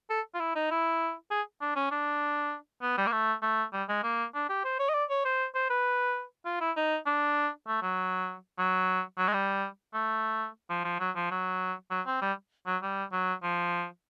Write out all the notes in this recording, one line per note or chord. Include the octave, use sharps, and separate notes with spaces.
A4
F4
E4
D#4
E4
G#4
D4
C#4
D4
B3
G3
A#3
A3
A3
G3
G#3
A#3
D4
G4
C5
C#5
D#5
D5
C#5
C5
C5
B4
F4
E4
D#4
D4
A3
F#3
F#3
F#3
G#3
G3
A3
F3
F3
F#3
F3
F#3
F#3
C4
G3
F#3
G3
F#3
F3